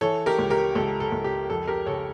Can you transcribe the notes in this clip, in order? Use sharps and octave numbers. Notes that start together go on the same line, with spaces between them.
E3 A4 C#5
G4 A#4
C#2
G4 A#4
C#2 A4
A4
C#2
G4
F2 A4
G4 A#4
C#3 A4 C#5